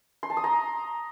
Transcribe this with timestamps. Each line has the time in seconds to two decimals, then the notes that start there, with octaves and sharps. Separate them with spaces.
0.23 C6
0.30 A5
0.37 D#6
0.44 A#5